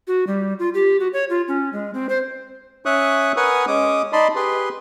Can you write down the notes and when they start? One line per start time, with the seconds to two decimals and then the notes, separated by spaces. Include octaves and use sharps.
0.08 F#4
0.27 G3
0.59 F4
0.74 G4
1.00 F#4
1.13 C#5
1.30 F4
1.48 C#4
1.73 G#3
1.94 C4
2.09 C5
2.86 C#4 C#5 E5 C#6 D#6 F#6
3.37 A#4 B4 F#5 G#5 C#6 D#6
3.67 G#3 C#4 D6 D#6
4.13 D#4 D5 D#5 A5 B5 C6
4.35 G4 G#4 B4 C6